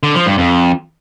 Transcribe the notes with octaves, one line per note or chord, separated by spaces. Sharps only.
D3
F3
G2
F2